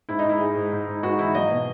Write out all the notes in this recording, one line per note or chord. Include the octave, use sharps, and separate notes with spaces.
G#2 E4
D#4
G#2
E4
G#3
G#2
G#2
G#2
G#2 F#4
E3 E4
F#3 D#5
B2